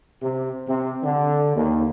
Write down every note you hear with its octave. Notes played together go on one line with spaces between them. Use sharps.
C3
C3
D3
D#2